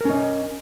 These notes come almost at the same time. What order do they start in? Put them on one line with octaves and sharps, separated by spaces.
A#4 C#4 D#5